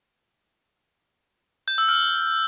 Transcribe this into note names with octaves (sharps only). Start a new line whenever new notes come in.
G6
E6
F6